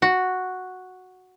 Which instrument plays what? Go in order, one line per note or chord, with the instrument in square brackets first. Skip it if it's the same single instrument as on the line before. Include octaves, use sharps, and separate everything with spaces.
[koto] F#4